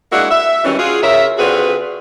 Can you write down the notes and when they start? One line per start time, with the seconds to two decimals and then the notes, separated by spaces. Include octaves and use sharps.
0.12 G#3 A#3 D4 E4 F#4 F#5
0.30 E5
0.64 D#3 E3 F#3 G3 C#4
0.78 F4 F#4 G#4
1.02 C#3 A#4 E5
1.38 D3 C4 F4 F#4 G#4 B4